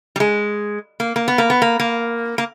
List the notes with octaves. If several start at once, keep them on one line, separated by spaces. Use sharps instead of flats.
G3
G#3
A#3
A#3
B3
A#3
B3
A#3
A#3
A#3